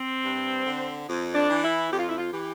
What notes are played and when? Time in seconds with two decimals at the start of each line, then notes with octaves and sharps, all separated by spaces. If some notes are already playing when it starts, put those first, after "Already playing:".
Already playing: C4
0.23 G2
0.65 D3
1.07 F2
1.35 D4
1.49 E3
1.64 E4
1.91 F2 G4
1.99 F4
2.09 E4
2.17 F4
2.33 E3 G4